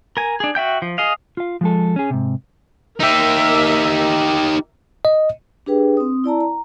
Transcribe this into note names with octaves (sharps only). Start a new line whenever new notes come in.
A#4 G#5
D4 G#4
F#4 E5 G5 G6
F3
G#4 D#5 F5
F4 F5
F3 G#3 A4
C#4 G#4
G#2 C3
D#4 G4 A#4 E5
D#5
D4 G4 G#4 B4 G5
C4 D#6
E4 D5 A5 A#5
A#5